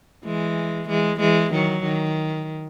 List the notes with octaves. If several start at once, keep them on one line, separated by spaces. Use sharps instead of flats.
E3 G#3
E3 G#3
E3 G#3
D#3 F#3
D#3